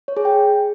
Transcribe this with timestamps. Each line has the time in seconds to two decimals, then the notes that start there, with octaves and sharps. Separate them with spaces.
0.08 C#5
0.17 G#4
0.25 G5